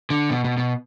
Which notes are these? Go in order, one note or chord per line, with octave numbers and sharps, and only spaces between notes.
D3
B2
B2
B2